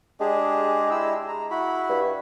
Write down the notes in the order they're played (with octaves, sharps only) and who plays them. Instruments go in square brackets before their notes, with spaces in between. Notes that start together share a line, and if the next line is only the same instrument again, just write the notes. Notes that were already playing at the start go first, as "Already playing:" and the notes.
[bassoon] G#3 [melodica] D4 G4 G#4
[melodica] E4 G4 E6
A#5
E4 F#4 B5
[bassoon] G2